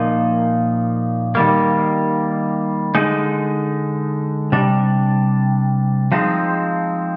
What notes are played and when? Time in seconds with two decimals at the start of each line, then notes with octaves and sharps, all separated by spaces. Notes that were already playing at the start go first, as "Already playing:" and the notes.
Already playing: A#2 F3 A#3 D#4
1.35 D#3 G3 A#3
2.95 D3 G#3 D#4
4.52 C3 G3 D4
6.12 F3 G#3 C4 D#4